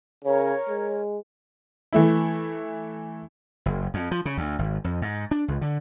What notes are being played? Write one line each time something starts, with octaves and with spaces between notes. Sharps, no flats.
C#3 A#4 C#5
G#3
E3 A3 E4
F#1
F2
F3
C#3
D2
G#1
F2
G#2
D4
C#2
D3